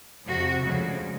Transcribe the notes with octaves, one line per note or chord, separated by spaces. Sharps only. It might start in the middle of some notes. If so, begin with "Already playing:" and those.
F2 C3 F3 F#4
D2 C#3 F3 G#3